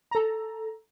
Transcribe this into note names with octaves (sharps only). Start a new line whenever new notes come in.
A4 A#5